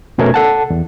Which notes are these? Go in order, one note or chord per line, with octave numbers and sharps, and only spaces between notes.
F2 B2 A3 C#4 A#4 G#6
A4 F#5 A5
E2